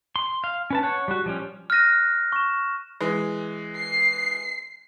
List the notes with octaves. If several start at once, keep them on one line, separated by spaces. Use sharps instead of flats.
C6
F5
C#4 B4 A5
C#5 F#5
G3 F#4
F3 G3 C#4
F6 F#6 A#6 D#7
C#6 E7
E3 G#3
C7